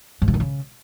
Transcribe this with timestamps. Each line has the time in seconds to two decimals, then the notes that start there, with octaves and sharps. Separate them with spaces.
0.22 G#2
0.28 C3
0.34 D#3
0.40 C#3